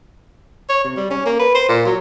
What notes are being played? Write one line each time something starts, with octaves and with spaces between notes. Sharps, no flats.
C#5
C3
G3
C#4
A#3
B4
C5
A#2
F#3